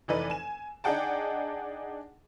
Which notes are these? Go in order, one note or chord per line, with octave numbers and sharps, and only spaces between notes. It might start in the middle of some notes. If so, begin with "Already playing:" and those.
F1 E3 D#4 A4 B4 D5
G#5 E7
D4 D#4 G#4 F#5 G5 A5